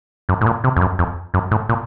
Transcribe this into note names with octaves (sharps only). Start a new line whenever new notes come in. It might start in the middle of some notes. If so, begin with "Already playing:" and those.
F#2
A2
A#2
C3
F2
F#2
F2
F#2
A2
A#2